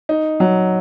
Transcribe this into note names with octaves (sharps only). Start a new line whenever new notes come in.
D#4
F#3